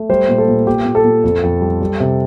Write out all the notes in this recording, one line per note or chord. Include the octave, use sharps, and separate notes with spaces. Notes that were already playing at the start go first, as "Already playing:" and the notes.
Already playing: A3
G3 C5
A#2
A4
A#2
A#2 G4
A#2
A4
A#2
F2
F2
G3
G3
C3